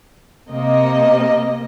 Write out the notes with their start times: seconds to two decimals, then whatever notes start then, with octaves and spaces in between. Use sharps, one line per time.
0.51 C3 A#3 D#5